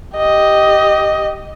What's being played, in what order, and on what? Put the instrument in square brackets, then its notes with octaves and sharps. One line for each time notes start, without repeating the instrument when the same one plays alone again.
[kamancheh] G4 D#5